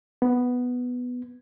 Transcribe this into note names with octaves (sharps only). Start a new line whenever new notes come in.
B3